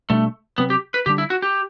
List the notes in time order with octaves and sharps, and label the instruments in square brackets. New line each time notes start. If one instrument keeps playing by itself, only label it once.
[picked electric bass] B2 G3 B3 D4 [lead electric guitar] A3
[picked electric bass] C3 F#3 C4 [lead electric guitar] B3
[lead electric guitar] G4
B4
[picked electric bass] D3 G3 D4 [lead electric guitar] G4
[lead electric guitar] E4
F#4
G4